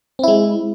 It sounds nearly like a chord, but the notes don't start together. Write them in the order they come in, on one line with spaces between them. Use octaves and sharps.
C4 E4 G#3